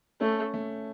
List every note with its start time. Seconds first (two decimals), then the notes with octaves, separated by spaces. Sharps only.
0.21 A3 C#4
0.54 A3